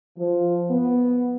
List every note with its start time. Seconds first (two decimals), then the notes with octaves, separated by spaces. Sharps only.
0.18 F3
0.70 B3